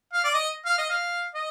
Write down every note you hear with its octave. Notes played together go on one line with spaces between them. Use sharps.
F5
D5
D#5
F5
D#5
F5
D#5